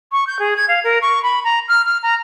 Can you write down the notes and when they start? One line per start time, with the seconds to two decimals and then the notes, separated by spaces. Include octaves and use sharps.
0.12 C#6
0.27 G6
0.39 G#4
0.57 G#6
0.68 F5
0.84 A#4
1.02 C#6
1.23 B5
1.44 A#5
1.68 F6
1.86 F6
2.03 A#5